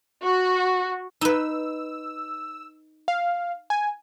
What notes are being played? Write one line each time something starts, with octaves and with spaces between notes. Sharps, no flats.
F#4
D#4 B4 E6
F5
G#5